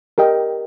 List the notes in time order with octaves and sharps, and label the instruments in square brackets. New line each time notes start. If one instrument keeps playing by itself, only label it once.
[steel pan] G4 A#4 D#5 G5